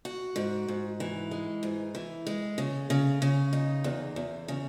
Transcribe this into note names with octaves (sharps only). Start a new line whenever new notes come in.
F#4
G#2
G#2
E3
G#3
G#2
E3
G#3
C#3
C#3
C#3
D#4
E2
E2
C#3